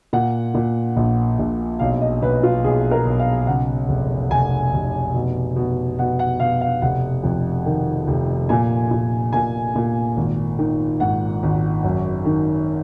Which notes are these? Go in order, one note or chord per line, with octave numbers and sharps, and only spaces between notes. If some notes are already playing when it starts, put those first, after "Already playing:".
A#2 F#5
A#2
A#1
A#1
B1 F5
D#5
B1 B4
F4
B1 G#4
A#4
B1
F5
C#3 F#5
F1
F1 G#5
F1
B2
B2
B2 F#5
F#5
B2 F5
F5
F1 F#5
F2
D#3
F1
A#2 G#5
A#2
A#2 G#5
A#2
G#1
D#3
G#2 F#5
G#1
F#2
D#3